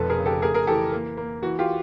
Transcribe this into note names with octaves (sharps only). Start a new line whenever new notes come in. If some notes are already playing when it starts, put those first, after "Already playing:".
Already playing: F1 F2 B2 A4 B4
G#4 A#4
C#3
G4 A4
A3 G#4 A#4
G#4 A#4
E3 G4 A4
A#3
A#3
E3 F#4
F4 G4